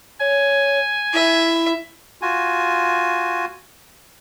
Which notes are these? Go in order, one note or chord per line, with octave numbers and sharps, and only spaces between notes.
C#5 G#5
E4 E5
F4 F#4 G#5